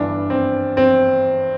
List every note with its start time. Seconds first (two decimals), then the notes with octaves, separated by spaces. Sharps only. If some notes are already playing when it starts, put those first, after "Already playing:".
Already playing: G1 G2 E3 D4
0.30 C4
0.77 C4